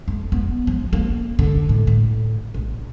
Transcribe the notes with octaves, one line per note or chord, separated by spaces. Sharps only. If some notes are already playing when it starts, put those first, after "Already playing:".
F2
B3
F3
A#3
D3
A2
A2
A#1